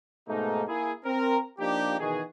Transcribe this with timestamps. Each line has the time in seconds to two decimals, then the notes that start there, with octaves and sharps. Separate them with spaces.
0.28 G#2 B2 A3 A#3 D#4
0.68 A#3 E4 G#4
1.05 C4 A#4
1.59 F3 A#3 D4 D#4 G4
1.99 B2 D#3 E3 F#4 G#4